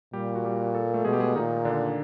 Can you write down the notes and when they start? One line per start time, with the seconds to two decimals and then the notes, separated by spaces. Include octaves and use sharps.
0.13 A#2 G3 G4
0.35 F#4
0.45 G3 G4
0.74 A4
0.94 A3 A4
1.04 B2 G#3 G#4
1.13 G4
1.20 G#3 G#4
1.35 A#2 D#3 D#4
1.65 D3 D4